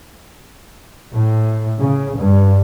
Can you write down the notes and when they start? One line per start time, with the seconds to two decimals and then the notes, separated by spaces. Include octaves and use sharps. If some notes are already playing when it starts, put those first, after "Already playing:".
1.13 A2
1.80 C#3
2.17 G2